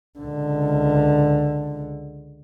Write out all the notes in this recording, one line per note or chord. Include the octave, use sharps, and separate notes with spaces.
C#2 D3